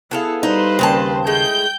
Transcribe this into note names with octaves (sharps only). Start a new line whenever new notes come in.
B3 E4 G#4 A4 F5
G3 D#4 B4 C5
D#2 C#3 C4 A5
G#3 A3 E4 G5 G6